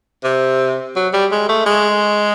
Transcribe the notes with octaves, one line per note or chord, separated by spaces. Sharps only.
C3
F#3
G3
G#3
A3
G#3